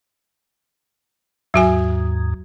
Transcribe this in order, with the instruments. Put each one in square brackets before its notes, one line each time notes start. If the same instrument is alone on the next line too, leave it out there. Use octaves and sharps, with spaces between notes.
[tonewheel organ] D#2 G#2 [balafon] F#3 F#4 G#5